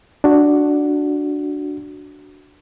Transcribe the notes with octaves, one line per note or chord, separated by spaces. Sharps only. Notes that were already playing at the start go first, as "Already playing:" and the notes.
D4 F#4